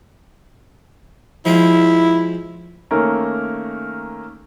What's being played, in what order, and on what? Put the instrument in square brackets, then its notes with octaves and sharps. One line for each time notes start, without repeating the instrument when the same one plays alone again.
[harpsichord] F3 G#3 F4 [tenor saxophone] E4
[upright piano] D#3 A3 A#3 C#4 A#4